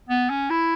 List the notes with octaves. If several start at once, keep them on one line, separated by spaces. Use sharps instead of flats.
B3
C#4
E4